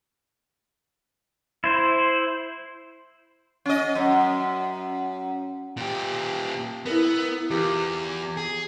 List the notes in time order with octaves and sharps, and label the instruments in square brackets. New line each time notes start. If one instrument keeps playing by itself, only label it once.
[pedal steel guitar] E4 C5
[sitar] C#4 D#5
F#2
[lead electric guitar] A#2 G4
[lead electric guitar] B3 [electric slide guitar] E4 A4 A#4
[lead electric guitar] E2 [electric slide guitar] F4 G4
[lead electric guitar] G#4